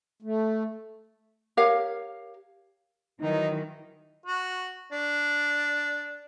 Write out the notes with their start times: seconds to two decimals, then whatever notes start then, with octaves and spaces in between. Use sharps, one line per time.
0.22 A3
1.57 G4 A#4 C#5 F5
3.21 D#3 E3 F#3 D#4
4.26 F#4
4.92 D4